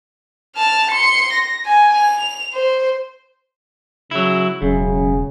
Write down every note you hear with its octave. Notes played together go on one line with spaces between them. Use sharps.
A5 F6
C6 C#7
A#6
G#5
F7
C5
C#3 F#3 E4
E1 F#2 C#3